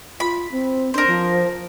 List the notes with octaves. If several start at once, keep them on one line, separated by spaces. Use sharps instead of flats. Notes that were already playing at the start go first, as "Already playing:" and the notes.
F4 B5
C4
D4 A#4 C5
F3